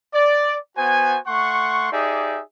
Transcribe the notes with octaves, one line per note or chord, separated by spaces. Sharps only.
D5
B3 F#4 C5 G#5
A3 F#5 C6 C#6
D#4 G4 G#4 D5 E5